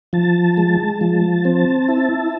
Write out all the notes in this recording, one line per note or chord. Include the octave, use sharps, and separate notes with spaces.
F3 A5
G#3
F3
C4
E4